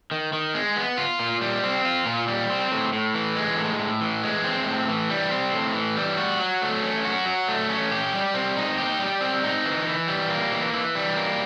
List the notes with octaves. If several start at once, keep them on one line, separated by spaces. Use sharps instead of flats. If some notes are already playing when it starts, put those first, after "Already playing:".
D#3
D#3
G#3
B3
F4
A#2
G3
C4
F4
A#2
G3
C4
A2
A2
E3
G#3
A2
A2
E3
G#3
C4
A2
E3
G3
C4
A2
E3
G3
F#4
F#3
A3
C#4
F#4
F#3
A3
C#4
G4
G3
C4
D#4
G4
G3
C4
D#4
E3
E3
G3
A#3
E3
E3
G3
A#3